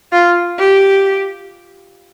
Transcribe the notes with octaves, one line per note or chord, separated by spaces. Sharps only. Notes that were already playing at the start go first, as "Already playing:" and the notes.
F4
G4